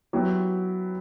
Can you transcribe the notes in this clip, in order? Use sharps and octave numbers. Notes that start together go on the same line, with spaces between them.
F#3 B3 E4 G4